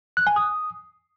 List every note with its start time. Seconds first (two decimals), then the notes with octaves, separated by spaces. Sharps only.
0.17 F#6
0.27 G#5
0.36 D#6